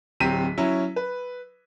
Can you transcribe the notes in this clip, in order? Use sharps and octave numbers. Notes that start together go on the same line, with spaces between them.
D1 F#3 C4 G4 B6 D#7
F#3 C#4 E4
B4